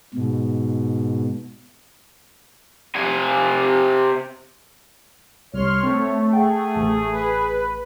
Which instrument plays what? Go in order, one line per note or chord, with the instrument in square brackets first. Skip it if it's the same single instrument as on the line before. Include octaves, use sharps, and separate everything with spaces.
[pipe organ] G#2 B2
[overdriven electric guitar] C3 G#5
[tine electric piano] C2 [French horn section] C#5 [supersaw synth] C6 F6
[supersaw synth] A3 [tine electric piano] C4
[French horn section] G#4 [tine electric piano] F#5 G5
[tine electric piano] A1
[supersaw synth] B4